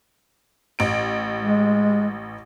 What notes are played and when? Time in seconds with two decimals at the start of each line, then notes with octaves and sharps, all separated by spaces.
0.79 A1 D7
1.42 G#3